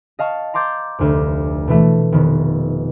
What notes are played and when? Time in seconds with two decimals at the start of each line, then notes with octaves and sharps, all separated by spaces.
0.19 D#5 F5 A5 C#6
0.54 A#5 C6 D6 G6 A6
0.99 F1 D2
1.68 B2 E3 A3
2.12 F1 D#3 B3